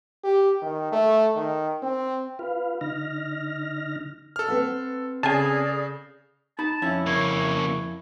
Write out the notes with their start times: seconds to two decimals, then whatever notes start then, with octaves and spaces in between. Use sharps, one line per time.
0.24 G4
0.62 D#3
0.92 A3
1.36 D#3
1.83 C4
2.39 F4 B4 F5
2.81 D3 D#4 F6 A#6
4.36 A4 F6
4.48 C4 B4 F#5
5.23 C#3 G#4 A4 D5 G#5 A5
6.59 D#4 A5 B5
6.82 F2 C#4 E4
7.06 C#3 A#3 C#5